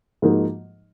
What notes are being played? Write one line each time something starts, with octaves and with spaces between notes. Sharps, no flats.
G#2 F3 A#3 D#4 F#4